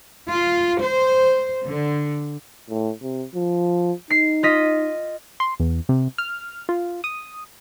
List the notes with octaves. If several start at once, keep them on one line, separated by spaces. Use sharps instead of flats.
F4
C5
D3
A2
C3
F3
D#4 C7
F4 D#5 B6
C6
E2
C3
F6
F4
D#6